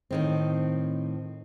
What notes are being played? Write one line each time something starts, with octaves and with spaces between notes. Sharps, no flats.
A2 D#3 C4